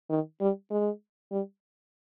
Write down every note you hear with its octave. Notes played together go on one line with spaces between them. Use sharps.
D#3
G3
G#3
G3